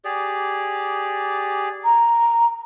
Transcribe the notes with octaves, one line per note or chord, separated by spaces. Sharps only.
G4 G#4 D5
A#5